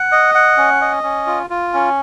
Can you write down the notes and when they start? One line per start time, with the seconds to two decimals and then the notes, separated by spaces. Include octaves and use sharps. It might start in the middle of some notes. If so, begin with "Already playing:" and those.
Already playing: F#5
0.12 D#5
0.35 F#5
0.58 C#4
0.81 D#5
1.03 C#4
1.27 F4
1.50 F4
1.74 C#4